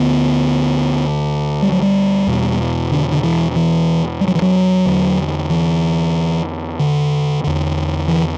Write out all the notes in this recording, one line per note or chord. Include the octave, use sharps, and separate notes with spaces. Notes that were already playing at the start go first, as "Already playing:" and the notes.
Already playing: D2 D3 B3
G3
F#3
G3
E2 B2
D3
D3
E3
E3
G3
F#3
E3
F#3
E2 D3
E3
D3
E2 D3
E3